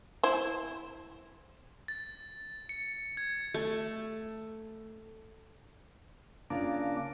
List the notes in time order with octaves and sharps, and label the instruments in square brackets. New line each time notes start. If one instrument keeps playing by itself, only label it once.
[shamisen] E4 C5
[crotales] A6
C#7
G#6
[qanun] A3
[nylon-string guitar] C#3 F4 [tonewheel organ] A#3 D4